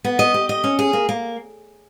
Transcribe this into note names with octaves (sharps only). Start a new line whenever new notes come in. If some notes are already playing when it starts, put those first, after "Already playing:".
B3
D#5
G4
D#5
C#4
G#4
A#3
A#3